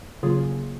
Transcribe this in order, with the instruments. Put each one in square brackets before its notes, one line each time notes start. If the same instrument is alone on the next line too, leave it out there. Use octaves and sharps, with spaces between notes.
[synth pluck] C#3 F#3 A#3 F4 G#4